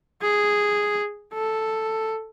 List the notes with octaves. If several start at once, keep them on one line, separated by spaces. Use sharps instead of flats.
G#4
A4